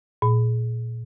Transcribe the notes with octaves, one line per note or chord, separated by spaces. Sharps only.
A#2